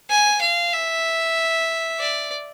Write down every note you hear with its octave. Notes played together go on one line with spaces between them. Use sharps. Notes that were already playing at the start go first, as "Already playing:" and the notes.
G#5
F5
E5
D5